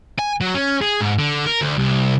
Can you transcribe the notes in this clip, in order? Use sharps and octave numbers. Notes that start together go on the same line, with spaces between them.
G#5
F#3
C#4
G#4
G#2
D3
A#4
D2
C2